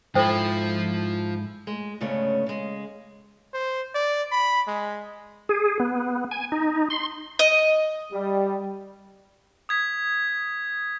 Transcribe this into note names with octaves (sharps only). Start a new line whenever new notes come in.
G#2 F3 E4 F4 A4 C5 G5
G#3
D2 G#2 C#3 A3 B3 C#4
C#3 G#3
C5
D5
B5
G#3
G#4
B3
G#5
D#4
C6
D#5
G3
D#6 G#6 B6